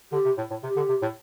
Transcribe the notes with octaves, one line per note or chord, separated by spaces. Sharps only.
D3 G4
C3
A2
A2
C3 G4
D3
C3
A2